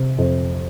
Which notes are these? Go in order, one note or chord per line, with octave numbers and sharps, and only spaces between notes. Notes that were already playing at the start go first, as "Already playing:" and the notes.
Already playing: C3
F2